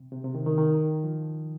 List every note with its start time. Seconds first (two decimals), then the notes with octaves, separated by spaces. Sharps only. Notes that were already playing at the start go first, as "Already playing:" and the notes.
Already playing: C3
0.12 C3
0.24 C3
0.35 D#3
0.46 D#3
0.58 D#3
1.04 F3